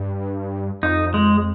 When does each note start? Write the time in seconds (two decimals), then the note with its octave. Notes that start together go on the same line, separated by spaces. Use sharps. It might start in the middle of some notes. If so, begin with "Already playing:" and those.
Already playing: G2
0.83 F2 D#4
1.14 G#3